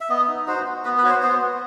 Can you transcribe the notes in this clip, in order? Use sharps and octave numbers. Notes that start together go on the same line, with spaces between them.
E5
B3 D#5
D#4
F#4 C5
F#4
B3 B4
B4
F#4 C#5
C5
B3 C5
B3